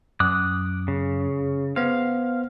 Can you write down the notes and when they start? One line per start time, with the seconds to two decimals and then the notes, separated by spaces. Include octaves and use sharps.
0.20 F#2 D6 D#6 F#6
0.88 C#3
1.76 B3 C5 F5